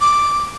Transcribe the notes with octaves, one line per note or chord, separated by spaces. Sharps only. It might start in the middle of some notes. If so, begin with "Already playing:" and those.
D6